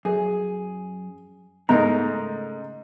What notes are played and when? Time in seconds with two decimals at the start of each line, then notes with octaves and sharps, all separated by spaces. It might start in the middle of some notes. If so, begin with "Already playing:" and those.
0.05 F#2 G#4
1.69 G#2 C#3 A3 B3 D#4 A#4 A#5